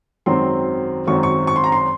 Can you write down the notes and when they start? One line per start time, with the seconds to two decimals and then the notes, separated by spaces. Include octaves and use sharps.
0.26 G#1 F#2 D#3 F#3 C4 C6
1.07 G#1 F#2 D#3 F#3 C4 C#6
1.23 C#6
1.47 C#6
1.56 C6
1.64 A#5
1.72 C6